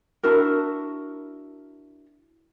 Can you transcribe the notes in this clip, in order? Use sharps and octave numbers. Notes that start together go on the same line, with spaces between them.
D4 E4 F#4 A#4